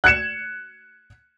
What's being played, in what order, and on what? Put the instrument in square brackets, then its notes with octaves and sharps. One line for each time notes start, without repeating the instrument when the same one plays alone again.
[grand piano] F#6 G#6 C#7 E7